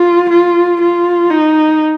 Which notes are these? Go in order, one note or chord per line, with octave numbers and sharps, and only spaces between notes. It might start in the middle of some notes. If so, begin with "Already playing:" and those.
Already playing: F4
F4
F4
D#4